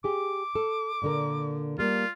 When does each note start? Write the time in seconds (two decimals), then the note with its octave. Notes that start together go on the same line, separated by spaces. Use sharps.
0.04 G4 G#4 D6
0.55 A4
1.02 A#2 D3 A#4
1.79 G3 A#3 F4